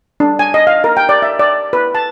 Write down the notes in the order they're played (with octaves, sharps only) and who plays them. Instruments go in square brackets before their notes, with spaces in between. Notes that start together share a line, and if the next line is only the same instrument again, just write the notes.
[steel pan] D4
G#5
D#5
F5
A#4
G5
D5
E5
D5
B4
A5